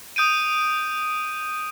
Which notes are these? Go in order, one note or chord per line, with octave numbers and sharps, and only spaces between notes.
D#6 G6 D7 D#7